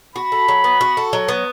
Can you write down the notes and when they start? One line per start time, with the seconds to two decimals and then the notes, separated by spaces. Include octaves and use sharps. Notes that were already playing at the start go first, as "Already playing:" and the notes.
0.15 F#4 B5
0.32 A4
0.48 F#3
0.64 B3
0.81 F#4
0.97 A4
1.13 F#3
1.28 B3